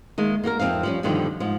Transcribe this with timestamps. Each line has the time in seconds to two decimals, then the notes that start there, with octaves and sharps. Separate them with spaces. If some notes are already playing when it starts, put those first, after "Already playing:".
0.18 D#3 G#3 A#3
0.44 A#3 F#4 G4 A#4
0.59 F2 C4 D#4 F5
0.83 F3 G3 C#4
1.03 G2 B2 D3 D#3 F3 G3
1.40 G#2 F3